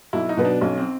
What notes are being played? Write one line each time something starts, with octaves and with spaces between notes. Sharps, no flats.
B1 E4
D#4
B2 F#3 B3
D4
B1 C#4
C4